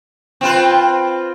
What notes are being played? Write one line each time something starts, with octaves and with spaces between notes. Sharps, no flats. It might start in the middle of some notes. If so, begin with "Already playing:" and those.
C4 F4 B4